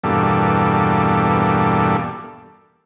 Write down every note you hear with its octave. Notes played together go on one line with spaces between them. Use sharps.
E2 G2 B2 G3 A#3 A4